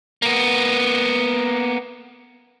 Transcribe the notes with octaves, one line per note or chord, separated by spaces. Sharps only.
A#3 B3